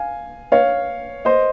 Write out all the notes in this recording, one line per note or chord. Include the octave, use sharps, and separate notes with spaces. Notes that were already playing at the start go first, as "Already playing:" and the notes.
Already playing: F5 G#5
C#5 F5
C5 D#5